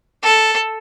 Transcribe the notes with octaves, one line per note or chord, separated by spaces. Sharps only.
A4